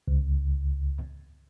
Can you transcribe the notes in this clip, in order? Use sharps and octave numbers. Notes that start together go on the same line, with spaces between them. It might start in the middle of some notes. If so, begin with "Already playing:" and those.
C#2